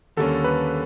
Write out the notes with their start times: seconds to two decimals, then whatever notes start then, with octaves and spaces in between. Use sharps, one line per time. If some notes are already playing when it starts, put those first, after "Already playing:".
0.17 D#2 D3 G3 A#3 C#4 A4
0.44 B4